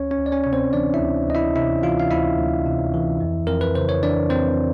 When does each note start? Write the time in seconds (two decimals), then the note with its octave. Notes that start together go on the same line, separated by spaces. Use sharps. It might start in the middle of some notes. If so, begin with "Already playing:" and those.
Already playing: D2 C#4 C#5
0.11 C#4 C#5
0.18 D2
0.26 D5
0.32 C#4 C#5
0.44 C3 C#5
0.53 C4 C5
0.73 E3 D4 D5
0.94 E4 E5
1.00 D2
1.28 D2 D#5
1.35 E4 E5
1.56 C3 E4 E5
1.83 E3 F4 F5
2.00 F5
2.10 D2 E4 E5
2.38 D2
2.66 C3
2.94 E3
3.21 F2
3.47 F2 A#4
3.61 B4
3.75 C#3 C5
3.89 C#5
4.03 E3 D4 D5
4.30 F2 C4 C5